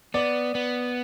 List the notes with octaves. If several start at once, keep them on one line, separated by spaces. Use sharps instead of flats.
B3 D5
B3